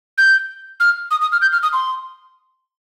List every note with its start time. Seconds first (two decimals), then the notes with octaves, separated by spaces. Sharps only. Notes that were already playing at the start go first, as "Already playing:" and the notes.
0.18 G6
0.80 F6
1.11 D#6
1.21 D#6
1.32 F6
1.42 G6
1.53 F6
1.63 D#6
1.73 C6